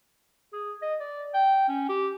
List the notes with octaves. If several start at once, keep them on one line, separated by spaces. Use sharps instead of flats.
G#4
D#5
D5
G5
C#4
G4